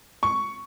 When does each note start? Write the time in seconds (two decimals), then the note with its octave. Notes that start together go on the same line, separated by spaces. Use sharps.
0.23 C#6